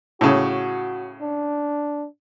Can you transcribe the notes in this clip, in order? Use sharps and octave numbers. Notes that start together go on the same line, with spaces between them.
A2 C#3 F#4
D4